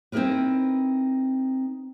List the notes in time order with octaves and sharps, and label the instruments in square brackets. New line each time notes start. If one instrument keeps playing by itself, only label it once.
[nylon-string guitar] C4 D#4 E4 G#4 A#4 B4